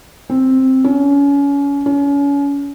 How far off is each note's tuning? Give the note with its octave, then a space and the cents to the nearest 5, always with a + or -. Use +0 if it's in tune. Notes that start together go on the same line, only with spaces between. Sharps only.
C4 +5
C#4 +30
C#4 +35